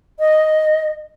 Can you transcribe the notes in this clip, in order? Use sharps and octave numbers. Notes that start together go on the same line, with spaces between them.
D#5